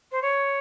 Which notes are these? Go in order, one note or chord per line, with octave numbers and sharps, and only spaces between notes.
C5
C#5